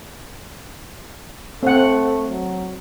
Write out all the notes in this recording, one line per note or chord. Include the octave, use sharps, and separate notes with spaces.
A3 C4 F#5
F#3